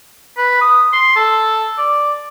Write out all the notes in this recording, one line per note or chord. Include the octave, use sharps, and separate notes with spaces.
B4
D#6
C6
A4
D5